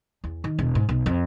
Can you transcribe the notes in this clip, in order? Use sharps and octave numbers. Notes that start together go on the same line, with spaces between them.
E2
D#3
E1
G#2
B1
F2